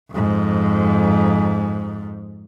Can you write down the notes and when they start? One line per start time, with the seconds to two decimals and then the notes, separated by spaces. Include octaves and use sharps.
0.11 F2 G#2